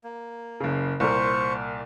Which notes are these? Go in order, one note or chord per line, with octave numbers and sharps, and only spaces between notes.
A#3
F#1 C#3
C2 A#2 A#4 C5 C#6